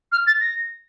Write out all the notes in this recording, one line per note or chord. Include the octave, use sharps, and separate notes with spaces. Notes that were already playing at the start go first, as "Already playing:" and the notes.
F6
A6
A#6